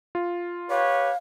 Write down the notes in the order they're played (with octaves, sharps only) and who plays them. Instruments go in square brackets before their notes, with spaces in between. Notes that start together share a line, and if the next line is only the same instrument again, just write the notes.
[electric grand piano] F4
[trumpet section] G4 B4 C#5 [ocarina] F5